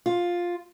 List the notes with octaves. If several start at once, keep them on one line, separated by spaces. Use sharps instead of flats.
F4